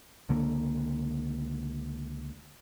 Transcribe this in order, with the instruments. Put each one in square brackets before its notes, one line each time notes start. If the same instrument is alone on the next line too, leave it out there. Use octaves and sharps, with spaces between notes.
[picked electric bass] C#2 D3 A#3